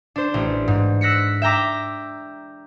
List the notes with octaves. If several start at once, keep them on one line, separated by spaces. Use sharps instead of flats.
D4 C5
A1
G#2
E6 F#6 A#6 B6 C#7
E5 G5 A#5 D6